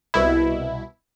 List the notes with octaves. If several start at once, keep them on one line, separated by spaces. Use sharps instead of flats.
C2 B2 E4